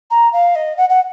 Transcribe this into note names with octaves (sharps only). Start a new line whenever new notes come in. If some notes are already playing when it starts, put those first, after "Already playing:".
A#5
F5
D#5
F#5
F#5